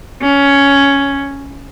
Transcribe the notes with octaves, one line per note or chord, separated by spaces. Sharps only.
C#4